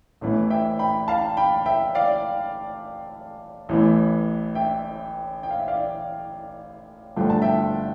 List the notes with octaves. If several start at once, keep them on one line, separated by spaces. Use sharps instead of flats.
A1 A2 E3 B3
E5 G5
G5 B5
F5 A5
G5 B5
E5 G5
D5 F5
A1 A2 E3 B3
E5 G5
G5
F5
E5
D5 F5
G1 G2 F3 A3 G5
A5
E5 G5